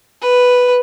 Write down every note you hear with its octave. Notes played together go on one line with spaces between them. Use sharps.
B4